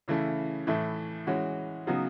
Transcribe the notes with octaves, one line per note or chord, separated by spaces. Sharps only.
C#3 E3 A3 E4
A2 E3 A3 E4
E3 G#3 C#4 F#4
C#3 F#3 B3 D#4 F#4